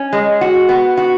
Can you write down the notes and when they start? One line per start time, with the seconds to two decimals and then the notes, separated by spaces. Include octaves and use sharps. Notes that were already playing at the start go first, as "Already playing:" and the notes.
Already playing: C#4
0.13 G#3
0.41 F#4
0.69 B3
0.97 F#4